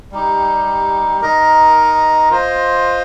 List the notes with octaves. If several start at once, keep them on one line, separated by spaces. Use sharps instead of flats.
G3 D#4 G4
D#4 A#4 D#5
F4 C5 D#5